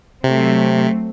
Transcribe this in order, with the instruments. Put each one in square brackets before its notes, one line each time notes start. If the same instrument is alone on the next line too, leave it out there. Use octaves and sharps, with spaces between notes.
[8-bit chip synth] C3 [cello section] F#3 A3 C4